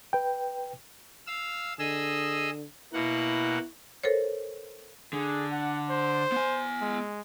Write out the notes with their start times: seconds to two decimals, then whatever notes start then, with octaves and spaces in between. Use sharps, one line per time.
0.13 B4 G5
1.27 F5 E6
1.79 D3 G#4 D#5 E6
2.93 B2 A#3 E4 F#5
4.03 A4 A#4 C5 C#5
5.13 D3 G#4
5.52 F#5
5.90 C5
6.32 B3 G#5
6.81 G#3